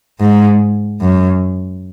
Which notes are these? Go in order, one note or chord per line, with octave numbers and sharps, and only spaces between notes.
G#2
F#2